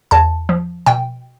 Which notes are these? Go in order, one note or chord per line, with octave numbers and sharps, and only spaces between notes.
E2 A5
F3
B2 G5